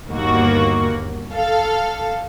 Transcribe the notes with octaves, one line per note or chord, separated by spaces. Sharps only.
G1 D#2 A#3 F#4
A4 F5